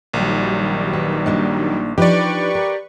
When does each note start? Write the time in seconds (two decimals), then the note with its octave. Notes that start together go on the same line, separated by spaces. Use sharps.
0.14 A#1 D#3 F#3 G3
0.93 B4
1.26 A#3 D4 D#4
1.98 F3 D4 D#4 G4 B4 D5 C#6
2.55 A#4